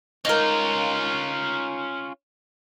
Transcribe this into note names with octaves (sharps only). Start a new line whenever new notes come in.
C#4 D#4 F4 A#4